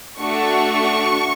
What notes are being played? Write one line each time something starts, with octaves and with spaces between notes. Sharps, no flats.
A3 D4 F#4 C#6